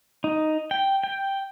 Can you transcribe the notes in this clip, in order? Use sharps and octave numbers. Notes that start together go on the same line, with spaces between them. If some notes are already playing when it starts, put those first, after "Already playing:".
D#4
G5
G5